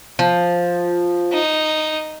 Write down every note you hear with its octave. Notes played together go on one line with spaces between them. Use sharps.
F3
D#4